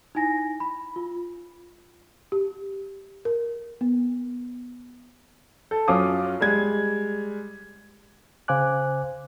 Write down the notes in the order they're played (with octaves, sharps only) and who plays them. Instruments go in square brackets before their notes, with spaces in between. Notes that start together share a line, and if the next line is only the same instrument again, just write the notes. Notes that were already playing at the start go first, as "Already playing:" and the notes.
[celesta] D#4 E4 G#5 A#6
B5
F4
[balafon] G4
A#4
B3
[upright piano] A4
F#2 C#4 F4 D6 D#6
G3 G#3 G#6
[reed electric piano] C#3 C5 F5 G#5 D6 F#6